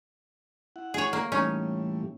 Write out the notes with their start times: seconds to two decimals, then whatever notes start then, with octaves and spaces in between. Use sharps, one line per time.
0.76 E4 F#5
0.94 G#4 C#5
1.13 A#3
1.32 A2 E3 G3 C#4 D#4